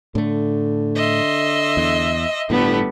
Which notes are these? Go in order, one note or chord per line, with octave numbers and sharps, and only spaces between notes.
A2 D3 A3
D#5 E5 C6
E2
G1 A2 G3 A3 B3